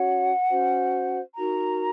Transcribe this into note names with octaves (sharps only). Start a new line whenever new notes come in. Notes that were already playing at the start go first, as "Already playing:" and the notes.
Already playing: C#4 F#4 C#5 F#5
C#4 F#4 C5
D#4 F#4 A#4 A#5